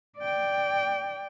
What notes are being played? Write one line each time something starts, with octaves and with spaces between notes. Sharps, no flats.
D5 G5